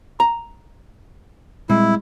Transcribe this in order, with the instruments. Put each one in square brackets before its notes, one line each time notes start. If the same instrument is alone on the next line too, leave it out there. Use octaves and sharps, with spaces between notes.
[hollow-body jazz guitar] A#5
[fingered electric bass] A#2 G3 C4 [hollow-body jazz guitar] G#3 [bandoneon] E4